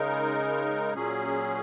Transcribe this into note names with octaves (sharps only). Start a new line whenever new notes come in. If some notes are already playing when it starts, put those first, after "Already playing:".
Already playing: C#3 G#3 D#4 A#4
A#2 F#3 C#4 G#4